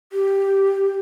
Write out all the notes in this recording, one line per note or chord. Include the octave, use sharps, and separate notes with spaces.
G4